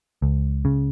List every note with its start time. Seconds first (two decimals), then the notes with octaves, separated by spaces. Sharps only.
0.22 C#2
0.65 C#3